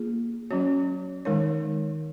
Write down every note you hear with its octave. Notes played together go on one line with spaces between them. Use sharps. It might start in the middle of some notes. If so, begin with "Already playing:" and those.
Already playing: A#3 F4 G#4
F#3 C#4 F#4 C#5
D#3 G#3 D#4 A#4 C#5